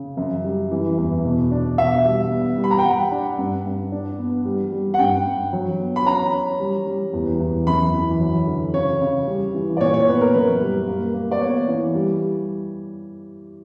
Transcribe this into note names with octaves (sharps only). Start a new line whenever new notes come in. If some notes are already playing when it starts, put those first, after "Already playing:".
Already playing: C#3
F#2
G3
E3
E2
B2
D4
B2 E5
G3
B3
G3
B5
A#5
G5
G3 F#5
D4
G2
G2
D4
B3
G3
G3
F#5
G2 G5
G2
F#3
B3
B5
C#4 A#5
C#4
G3
G3
E2
E2
F#2 B5
E3
F#3
D3
C#3 C#5
C#3
G3
E3
D5
A#2 C#5
C#5
B3 B4
A#4
F#2 B4
G3
A#3
A#3
D5
B3 C#5
E3
G3